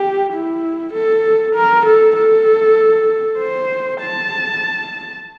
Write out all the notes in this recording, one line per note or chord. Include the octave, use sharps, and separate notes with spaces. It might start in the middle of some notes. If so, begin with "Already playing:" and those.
Already playing: G4
E4
A4
A#4
A4
A4
C5
A5